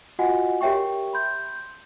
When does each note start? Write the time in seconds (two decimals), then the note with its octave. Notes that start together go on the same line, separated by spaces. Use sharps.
0.19 F4 F#4 D#5 F#5 G#5
0.61 G4 A#4 C#5 E5 G5 C#6
1.13 B5 C6 G6